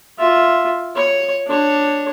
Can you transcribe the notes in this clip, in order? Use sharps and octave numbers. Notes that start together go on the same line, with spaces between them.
F4 E5
C#5
D4 C#5